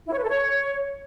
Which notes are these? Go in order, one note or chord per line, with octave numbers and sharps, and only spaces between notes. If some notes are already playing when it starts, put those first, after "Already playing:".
E4
C#5
B4
A4
C#5